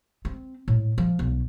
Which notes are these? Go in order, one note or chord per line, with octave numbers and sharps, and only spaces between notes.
C4
A2
F3
B1